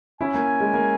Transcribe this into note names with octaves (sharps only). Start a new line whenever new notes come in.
C#4 E4 G#5
A#3
G#3
A#3